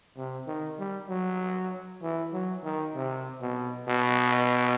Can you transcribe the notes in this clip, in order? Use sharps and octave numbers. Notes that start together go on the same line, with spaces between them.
C3
D#3
G3
F#3
E3
F#3
D#3
C3
B2
B2